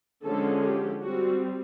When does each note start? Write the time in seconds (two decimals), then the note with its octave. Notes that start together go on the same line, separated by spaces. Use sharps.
0.25 D3 F3 G#3 C#4 A4
0.64 G4
1.03 G3 C4 F#4